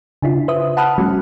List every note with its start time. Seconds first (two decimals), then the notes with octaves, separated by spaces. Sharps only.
0.22 C#3 D4 E4 F4
0.48 B4 C5 E5 D#6
0.77 F#5 A5 B5 D#6 F6 F#6
0.98 F3 G3 A3 C#4 F#4